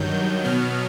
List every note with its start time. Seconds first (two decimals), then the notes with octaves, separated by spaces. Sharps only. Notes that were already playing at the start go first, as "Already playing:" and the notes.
Already playing: G2 D#3 F#3 G6
0.44 B2 F#3 B3 F6